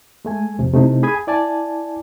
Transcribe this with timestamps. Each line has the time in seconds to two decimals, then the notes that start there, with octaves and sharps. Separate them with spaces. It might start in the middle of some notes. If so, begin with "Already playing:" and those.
0.25 G#3 A3 G#5
0.59 F2 C3
0.73 C3 A3 D#4 E4
1.03 G#4 B5 D#6 G#6
1.15 G#5
1.27 E4 D5 G#5 A5